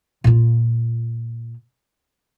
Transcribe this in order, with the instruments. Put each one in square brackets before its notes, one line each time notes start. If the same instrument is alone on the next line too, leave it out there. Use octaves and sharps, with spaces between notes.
[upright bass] A#2 F4